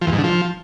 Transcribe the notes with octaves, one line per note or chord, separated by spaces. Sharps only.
F3
E2
G#2
D3
F3